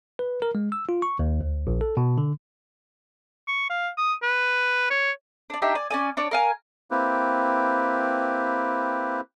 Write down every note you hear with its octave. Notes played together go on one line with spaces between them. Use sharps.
B4
A#4
G#3
E6
F4
C#6
D#2
D2
A#1
A4
B2
D3
C#6
F5
D#6
B4
C#5
D4 D5
D4 D#4 G4 E5
D5 G#5
C#4 D5 G#5
D4 C#5 D5
A#4 F5 G#5
A#3 C4 E4 G4 B4